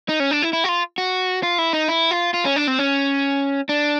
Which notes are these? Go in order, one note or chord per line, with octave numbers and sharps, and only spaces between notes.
D#4
C#4
D4
E4
E4
F#4
F4
F#4
F4
E4
D#4
E4
F4
F4
C#4
D4
C4
C#4
D4